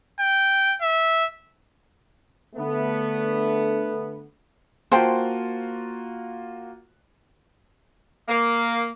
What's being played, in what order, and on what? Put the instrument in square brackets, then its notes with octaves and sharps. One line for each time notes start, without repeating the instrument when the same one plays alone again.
[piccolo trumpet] G5
E5
[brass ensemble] D3 A3 B3
[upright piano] A#3 F4 F#4 [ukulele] C5 G5 [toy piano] F5 A5 C6
[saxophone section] A#3